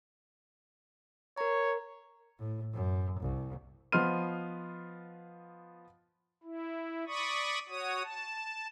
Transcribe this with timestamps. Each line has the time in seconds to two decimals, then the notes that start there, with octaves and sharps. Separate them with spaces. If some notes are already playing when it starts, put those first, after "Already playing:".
1.38 A#4 C#5 A#5
2.39 A2
2.73 F#2
3.20 C2
3.92 F3 B3 D#5 C6 F6 D#7
6.43 E4
7.07 D5 B5 C#6 D#6
7.69 F#4 C#5 D#6
8.04 A5